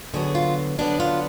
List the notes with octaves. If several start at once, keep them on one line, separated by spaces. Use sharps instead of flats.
D3 F#3 B3 G#4
F4
D3 F#3 B3 D4
F4